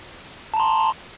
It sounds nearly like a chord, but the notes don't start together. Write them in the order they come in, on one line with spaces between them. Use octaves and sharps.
A5 A#5 C6